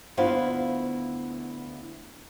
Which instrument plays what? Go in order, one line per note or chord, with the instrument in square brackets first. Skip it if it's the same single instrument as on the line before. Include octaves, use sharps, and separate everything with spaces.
[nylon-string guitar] D2 B3 E4 F4 C5 F5